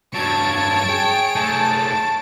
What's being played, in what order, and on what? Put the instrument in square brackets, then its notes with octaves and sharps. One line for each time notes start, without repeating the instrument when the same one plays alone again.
[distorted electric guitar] G2 F#3 [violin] C#5 D7 [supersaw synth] A5 G#6
[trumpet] G#4 [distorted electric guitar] G5
[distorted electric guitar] A3 D#4 [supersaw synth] A5